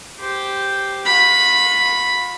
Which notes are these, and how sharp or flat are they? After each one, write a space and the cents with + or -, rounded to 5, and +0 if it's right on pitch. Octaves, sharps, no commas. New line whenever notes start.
G4 +0 C5 +0
F4 +45 B5 +0